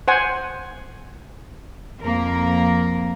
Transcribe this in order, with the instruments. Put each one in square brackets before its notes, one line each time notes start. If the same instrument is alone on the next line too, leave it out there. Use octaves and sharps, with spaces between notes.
[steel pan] C5 F#5 G#5
[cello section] F2 A#3 A#4